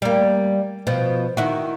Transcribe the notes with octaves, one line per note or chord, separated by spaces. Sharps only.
G3 A#3
B2 F3
D#3 E4 F#4